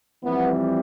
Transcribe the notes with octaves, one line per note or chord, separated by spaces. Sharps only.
F2 E3 G3 B3